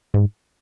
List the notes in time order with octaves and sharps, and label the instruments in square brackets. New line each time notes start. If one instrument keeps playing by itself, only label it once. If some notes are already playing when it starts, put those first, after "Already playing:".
[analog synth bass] G#2